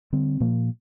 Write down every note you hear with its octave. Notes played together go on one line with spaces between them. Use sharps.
D3 G3 C4
A#2 F3 A#3